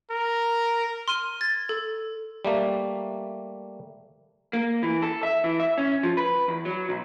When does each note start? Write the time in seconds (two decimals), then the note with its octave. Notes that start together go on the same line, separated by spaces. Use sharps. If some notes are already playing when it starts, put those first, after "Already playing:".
0.11 A#4
1.08 C6 F6 D#7
1.41 G#6 A6
1.69 A4
2.45 G3 A3 A#3
4.53 A#3
4.83 E3
5.02 A4
5.23 E5
5.44 E3
5.60 E5
5.78 C#4
6.03 F3
6.17 B4
6.48 E2
6.65 F#3
6.89 B1